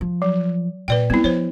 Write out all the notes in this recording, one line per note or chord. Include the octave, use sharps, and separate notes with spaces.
F3
F#3
A#2 B4 D5 G5
G3 B3 C4 E4
F3 C5 C#5